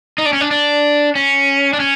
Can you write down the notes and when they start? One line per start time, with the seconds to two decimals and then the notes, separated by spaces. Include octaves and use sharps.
0.18 D#4
0.25 D4
0.33 C#4
0.41 D4
0.51 D4
1.15 C#4
1.73 D4
1.80 C#4